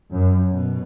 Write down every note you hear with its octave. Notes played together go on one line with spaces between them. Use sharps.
F#2
B2